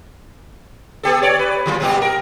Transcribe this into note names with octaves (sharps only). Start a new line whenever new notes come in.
B3 G4 A4
C#5 D5
B4
D#2 F#3 F4
A#2 G3 G4
A#4